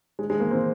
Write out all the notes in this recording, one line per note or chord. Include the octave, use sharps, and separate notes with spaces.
G#3
G#3
A#3
C4